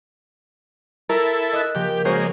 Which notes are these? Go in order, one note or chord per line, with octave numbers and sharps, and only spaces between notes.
E4 A4 A#4
D#5 D#6 F#6
C#3 F3 A#3 G4
G#3 A#3 C#4 F#4 C5